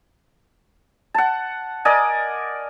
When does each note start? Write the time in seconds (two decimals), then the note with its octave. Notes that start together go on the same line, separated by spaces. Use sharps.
1.14 F#5 A5
1.85 A#4 D5 D#5 G#5